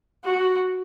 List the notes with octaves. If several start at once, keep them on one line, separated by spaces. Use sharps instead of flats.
F#4